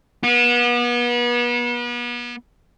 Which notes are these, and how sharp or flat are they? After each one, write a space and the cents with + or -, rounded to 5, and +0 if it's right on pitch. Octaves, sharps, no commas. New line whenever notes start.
B3 -35